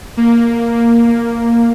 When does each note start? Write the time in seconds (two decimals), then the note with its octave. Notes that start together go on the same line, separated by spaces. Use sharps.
0.17 A#3
1.07 A#3